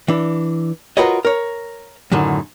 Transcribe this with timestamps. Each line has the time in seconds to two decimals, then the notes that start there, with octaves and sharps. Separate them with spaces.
0.08 E3 D4
0.97 F4 F#4 A#4 B4 C#5 D#5
1.25 A#4 C#5
2.12 F#2 A2 D3 D#3